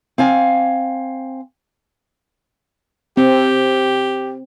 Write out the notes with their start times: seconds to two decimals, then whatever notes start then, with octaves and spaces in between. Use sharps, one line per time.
0.18 C4 F5 G#5
3.17 C4 G4